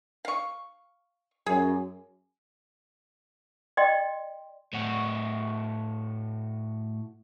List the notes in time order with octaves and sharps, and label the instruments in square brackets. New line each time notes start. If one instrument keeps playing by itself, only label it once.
[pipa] F5 C#6
[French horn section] F#2 [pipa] G#4
[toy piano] D5 D#5 G5 C6
[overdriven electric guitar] A2 F#4